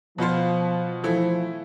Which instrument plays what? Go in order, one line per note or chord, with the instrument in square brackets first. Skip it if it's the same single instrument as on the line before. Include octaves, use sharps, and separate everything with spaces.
[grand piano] B2 B3 F4 C5 [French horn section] F3
[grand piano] E3 A3 E4 [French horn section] F3